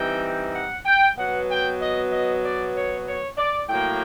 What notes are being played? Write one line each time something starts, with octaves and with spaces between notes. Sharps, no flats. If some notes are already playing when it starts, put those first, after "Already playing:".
Already playing: E3 G3 C4 D#4 G5
F#5
G5
B2 F#3 B3 F#5
G5
D#5
D#5
D5
C#5
C#5
D5
A2 F#3 A#3 G5